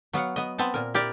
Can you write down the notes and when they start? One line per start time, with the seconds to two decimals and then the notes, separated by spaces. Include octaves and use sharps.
0.13 F#3 B3 F5 F#5
0.36 B3 D#5
0.58 B3 C4 B4 A5
0.74 A#2 A#4
0.94 E4 G4 A#4 D5